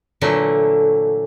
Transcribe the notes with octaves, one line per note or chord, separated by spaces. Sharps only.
A#2 D3 E3 F#3 A3